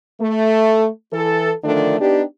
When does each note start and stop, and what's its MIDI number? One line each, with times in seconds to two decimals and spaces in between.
0.20 0.88 57
1.13 1.52 52
1.13 1.52 69
1.64 1.98 50
1.64 1.98 51
1.64 1.98 53
1.64 1.98 57
1.64 1.98 62
2.00 2.23 59
2.00 2.23 62
2.00 2.23 63
2.00 2.23 67